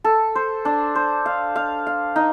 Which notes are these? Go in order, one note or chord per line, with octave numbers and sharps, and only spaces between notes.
A4
C5
D4
C5
F5
F5
F5
D#4